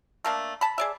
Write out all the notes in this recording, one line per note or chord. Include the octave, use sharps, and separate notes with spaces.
A3 A#3 D4
A5 B5
G#4 D5 E5